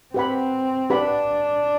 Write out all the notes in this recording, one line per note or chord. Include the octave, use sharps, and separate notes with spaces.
C4 G4 B4 F#5 B5
D4 G4 B4 F#5 B5